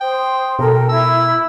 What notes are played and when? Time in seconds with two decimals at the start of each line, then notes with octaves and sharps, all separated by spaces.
0.01 C5 G5 D#6
0.59 B2 A4 A#4 G5
0.89 E4 E6